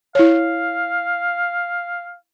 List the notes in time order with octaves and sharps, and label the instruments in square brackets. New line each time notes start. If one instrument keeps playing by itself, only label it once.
[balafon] E4 C#5 [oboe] F5